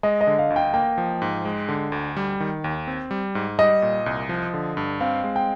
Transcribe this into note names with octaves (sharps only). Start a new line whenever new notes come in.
G#3 D#5
D#5
D3
F5
D2
G5
A#3 G5
F3
G#2
G#3
D3
D2
G3
D#3
D#2
C4
G3
G#2
G3 D#5
A#2
C2
F3
D3
G2
C4 F5
G#3
G5